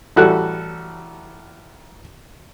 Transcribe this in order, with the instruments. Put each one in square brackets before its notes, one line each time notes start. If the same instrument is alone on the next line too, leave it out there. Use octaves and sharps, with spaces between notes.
[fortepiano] A1 G3 F#4 A4 F#6